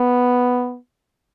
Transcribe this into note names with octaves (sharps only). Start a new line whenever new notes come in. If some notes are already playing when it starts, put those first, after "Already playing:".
Already playing: B3